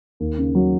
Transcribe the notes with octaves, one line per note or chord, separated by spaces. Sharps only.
D#2
C#3
F#3